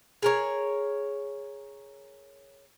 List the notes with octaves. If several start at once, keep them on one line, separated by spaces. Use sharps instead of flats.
G#4 A#4 C#5